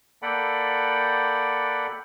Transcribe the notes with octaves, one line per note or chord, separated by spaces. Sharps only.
A#3 A4 D5 F#5 G5 B5